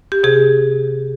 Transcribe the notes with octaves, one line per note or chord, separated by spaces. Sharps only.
G4
C3 G#4